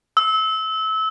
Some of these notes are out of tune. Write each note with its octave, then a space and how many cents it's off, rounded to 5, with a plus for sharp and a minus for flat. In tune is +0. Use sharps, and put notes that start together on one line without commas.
E6 -25